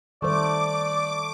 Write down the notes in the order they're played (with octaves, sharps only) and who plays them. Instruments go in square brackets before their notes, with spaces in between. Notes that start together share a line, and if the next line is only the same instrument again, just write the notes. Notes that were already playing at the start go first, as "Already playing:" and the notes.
[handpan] D#3 G3 C5 [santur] A3 [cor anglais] D5 [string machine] D6